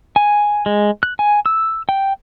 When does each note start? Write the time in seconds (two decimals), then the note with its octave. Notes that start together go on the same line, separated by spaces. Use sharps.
0.16 G#5
0.66 G#3
1.03 F#6
1.19 G#5
1.46 E6
1.89 G5